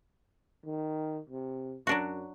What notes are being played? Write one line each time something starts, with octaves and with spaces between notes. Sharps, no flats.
D#3
C3
F#2 F#3 D4 F#4